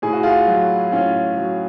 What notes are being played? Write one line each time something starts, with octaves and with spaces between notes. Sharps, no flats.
A2 G#4
F#4
F4 G#4
F#3
A2 C#4 F4
F#3